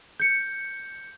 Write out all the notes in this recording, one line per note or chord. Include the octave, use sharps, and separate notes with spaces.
G6 C#7